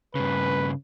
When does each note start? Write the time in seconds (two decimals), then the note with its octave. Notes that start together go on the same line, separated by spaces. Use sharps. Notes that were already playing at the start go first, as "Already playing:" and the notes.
0.15 G2 C#3 B4